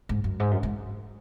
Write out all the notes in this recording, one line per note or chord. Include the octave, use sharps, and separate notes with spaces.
G#2
F#2
G#2
F#2
G#2